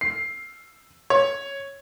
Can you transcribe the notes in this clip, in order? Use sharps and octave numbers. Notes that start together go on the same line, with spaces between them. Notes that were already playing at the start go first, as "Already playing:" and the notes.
C7
C#5